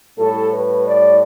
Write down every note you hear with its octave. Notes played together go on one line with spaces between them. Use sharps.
A2 G3 A4
B4
D5